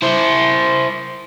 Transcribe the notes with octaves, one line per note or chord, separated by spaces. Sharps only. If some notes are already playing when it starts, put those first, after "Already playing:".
E4 C5